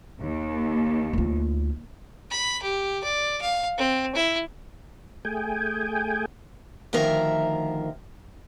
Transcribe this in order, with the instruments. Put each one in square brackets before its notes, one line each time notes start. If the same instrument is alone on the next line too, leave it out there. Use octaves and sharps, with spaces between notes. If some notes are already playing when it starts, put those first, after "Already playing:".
[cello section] D#2
[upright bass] D2 F4
[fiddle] B5
G4
D5
F5
C4
E4
[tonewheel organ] A3 G#4 G5 G#5
[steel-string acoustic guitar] D2 D#3 F3 A#4 E5